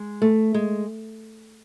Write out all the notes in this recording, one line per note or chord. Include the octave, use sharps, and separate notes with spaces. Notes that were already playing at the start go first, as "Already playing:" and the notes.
Already playing: G#3
A3
G#3